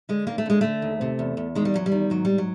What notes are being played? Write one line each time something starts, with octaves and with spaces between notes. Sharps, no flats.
D3 G#3
D#2 A#3
A3
D3 G#3
D3 A3
D#2
C3
E2
E2
D#3 G#3
G3
E2 F#3
G3
D#3
G#2 F#3
G#2 G3
F#3